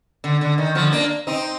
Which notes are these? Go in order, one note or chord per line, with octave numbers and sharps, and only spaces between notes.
D3
D3
D#3
D3 F3
A#3 D4
C4 D#4